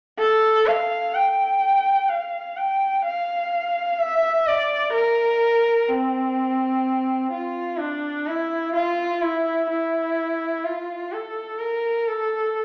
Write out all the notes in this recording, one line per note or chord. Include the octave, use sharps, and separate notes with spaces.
A4
F5
G5
F5
G5
F5
E5
D5
A#4
C4
F4
D4
E4
F4
E4
E4
F4
A4
A#4
A4